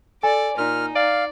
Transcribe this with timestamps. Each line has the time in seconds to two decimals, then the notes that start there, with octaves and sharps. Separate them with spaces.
0.23 A4 D5 G#5
0.58 A#2 D#4 F6
0.95 D5 F5